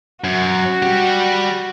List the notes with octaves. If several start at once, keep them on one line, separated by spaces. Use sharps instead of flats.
F#2 F#4
G3 G4